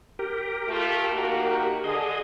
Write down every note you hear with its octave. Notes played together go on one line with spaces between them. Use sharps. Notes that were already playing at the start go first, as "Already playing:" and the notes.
G4 A#4
A3 F4
A#3 D#4 F#4
D3 G#4 D#5